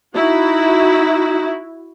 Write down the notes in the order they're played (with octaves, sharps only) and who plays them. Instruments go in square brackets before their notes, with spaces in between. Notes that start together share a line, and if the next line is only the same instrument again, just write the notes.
[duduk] D#4 [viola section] E4 F#4